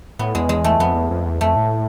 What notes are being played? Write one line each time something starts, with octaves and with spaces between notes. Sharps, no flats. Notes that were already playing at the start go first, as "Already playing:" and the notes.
A2 B3
E2 G#3
G#3
A3
F2 B3
E2
F2
E2
F2 A3
A2